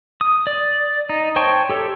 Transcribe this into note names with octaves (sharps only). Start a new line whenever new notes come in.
D#6
D5
D#4
C5 C#5 G5 A5 C#6
G4 A4 C#5